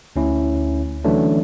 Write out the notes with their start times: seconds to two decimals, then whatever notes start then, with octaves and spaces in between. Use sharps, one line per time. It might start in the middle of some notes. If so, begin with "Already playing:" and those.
0.16 D2 C#4 E4
1.04 D3 E3 F#3 A3 C#4 D4